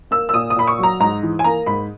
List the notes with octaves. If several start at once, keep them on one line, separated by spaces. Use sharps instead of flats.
A#3 E6
E6
A#2 D#6
D#6
A#2 B5
C#6
F#3 A#5
G#2 A#5
E3
G#5
A#3 A#5
G#2 B5